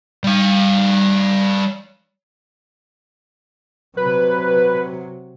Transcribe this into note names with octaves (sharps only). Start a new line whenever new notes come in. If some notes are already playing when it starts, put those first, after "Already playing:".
G3 F5
C3 F#3 B4